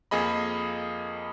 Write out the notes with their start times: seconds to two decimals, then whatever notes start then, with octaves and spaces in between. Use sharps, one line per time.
0.11 F2 A#3 G#4 D#5 B5